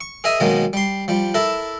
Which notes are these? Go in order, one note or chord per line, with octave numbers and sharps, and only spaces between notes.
C#6
G#4 A#4 D#5 E5 G#5
B2 D#3 F#3 G#3 A#3
G3 C6
F3 G3
E4 A4 A#4 E5 A5